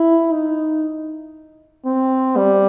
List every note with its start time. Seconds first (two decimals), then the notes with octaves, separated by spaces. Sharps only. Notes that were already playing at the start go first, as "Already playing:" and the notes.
Already playing: E4
0.32 D#4
1.85 C4
2.37 G3